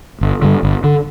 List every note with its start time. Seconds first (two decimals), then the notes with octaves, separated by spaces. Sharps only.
0.21 G1
0.42 G2 D3
0.63 G1
0.84 D3